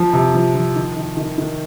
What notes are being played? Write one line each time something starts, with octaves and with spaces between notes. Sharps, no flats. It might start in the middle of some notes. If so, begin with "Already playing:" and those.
Already playing: F3
C3
F3
F3
D#3
D#3
D#3
D#3